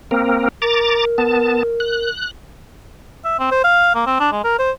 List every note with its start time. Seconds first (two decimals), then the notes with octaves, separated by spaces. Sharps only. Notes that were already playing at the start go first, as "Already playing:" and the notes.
0.11 A#3 C4 A#4
0.62 A#4 A#5 D6 A6
1.18 B3 A5
1.80 F#6
3.25 E5
3.39 C4
3.51 C5
3.64 F5
3.95 A#3
4.06 C4
4.20 D4
4.32 G#3
4.44 A#4
4.59 C5